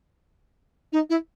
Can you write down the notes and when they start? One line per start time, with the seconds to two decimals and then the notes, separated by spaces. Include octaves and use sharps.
0.93 D#4
1.10 E4